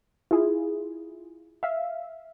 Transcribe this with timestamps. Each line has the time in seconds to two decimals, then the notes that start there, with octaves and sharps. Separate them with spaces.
0.31 E4 F4 G#4
1.63 E5 F5